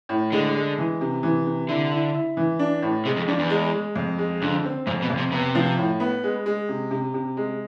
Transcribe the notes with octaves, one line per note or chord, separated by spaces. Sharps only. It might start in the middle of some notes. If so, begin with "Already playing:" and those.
A2
D3 G#3
G#3
E3
C3
E3
C3
D3 E4
E4
E4
E3
D4
A2
C3 G#3
F2
F2 D4
E2
G#3
G#3
F2
G#3
F2 D3
C4
F2 G#2
B2
F2
C3
C3 B3
F3
A2
B3
G#3
G#3
C3
C3
C3
G#3